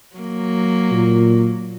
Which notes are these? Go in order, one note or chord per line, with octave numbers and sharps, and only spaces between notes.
F#3 A#3
A#2